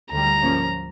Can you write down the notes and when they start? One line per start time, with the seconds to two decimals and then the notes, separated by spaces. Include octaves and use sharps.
0.12 D2 D3 G3 A#5
0.42 G#2 F3 A#3 C#4